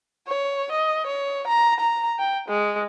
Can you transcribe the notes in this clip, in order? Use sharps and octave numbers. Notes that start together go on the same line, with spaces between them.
C#5
D#5
C#5
A#5
A#5
G5
G#3